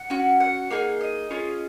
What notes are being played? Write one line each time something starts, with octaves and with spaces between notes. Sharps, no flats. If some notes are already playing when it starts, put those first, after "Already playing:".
Already playing: F#5
C#4 F#4
F#5
A#3 D#4 G#4
D#5
C#4 F4 G#4